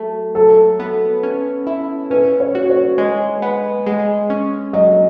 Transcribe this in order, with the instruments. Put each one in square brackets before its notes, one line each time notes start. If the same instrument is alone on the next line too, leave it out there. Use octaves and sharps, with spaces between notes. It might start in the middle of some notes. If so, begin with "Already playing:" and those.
Already playing: [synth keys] F#3 A3
[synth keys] F#3 [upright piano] A4
[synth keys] B3
C#4
E4
[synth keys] C#4 [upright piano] B4
[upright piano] C#5
[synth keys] F#4
[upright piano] C#5
[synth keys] G#3
B3
G#3
C#4
[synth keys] F#3 [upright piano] D#5